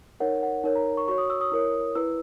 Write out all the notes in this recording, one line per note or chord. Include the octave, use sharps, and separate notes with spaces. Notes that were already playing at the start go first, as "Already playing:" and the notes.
D#4 A#4 C#5 F#5
F#5
D#4 A#4 C#5
A#5
C#6
F#4 C#5 C#6
D#6
E6
D#6
E4 A#4 C#5
E4 B4 E6